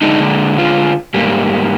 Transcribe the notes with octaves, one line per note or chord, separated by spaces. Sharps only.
D3 G#3 D4 D#4
F4
G#2 G3 A#3